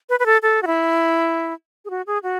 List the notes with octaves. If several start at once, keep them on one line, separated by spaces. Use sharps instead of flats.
B4
B4
A4
A4
F#4
E4
G#4
F#4
G#4
F#4